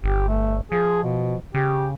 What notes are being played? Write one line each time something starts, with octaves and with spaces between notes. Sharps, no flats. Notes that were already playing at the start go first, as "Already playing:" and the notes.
G1 G4
A3
F3 G#4
B2
C#3 G4